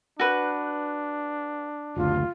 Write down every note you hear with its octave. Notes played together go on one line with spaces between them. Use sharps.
D4 F#4 B4
F#1 D2 F4